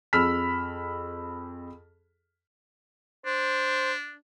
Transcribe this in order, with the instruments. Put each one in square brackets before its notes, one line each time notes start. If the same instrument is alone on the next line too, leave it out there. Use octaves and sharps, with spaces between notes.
[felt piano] F2 G#4 B5 E6 F6 B6
[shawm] D4 [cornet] C5